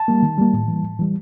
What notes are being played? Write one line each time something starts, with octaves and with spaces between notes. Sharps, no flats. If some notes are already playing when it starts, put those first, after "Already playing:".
Already playing: A5
G3 A#3
D#3
G3 A#3
A2
E3 G3
A2
E3 G3